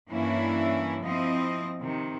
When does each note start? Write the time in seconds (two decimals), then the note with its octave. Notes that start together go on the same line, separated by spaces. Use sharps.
0.10 G2 E3 A#3 C#4 D4 E4
1.02 F3 C4 E4 D#5
1.80 C3 D#3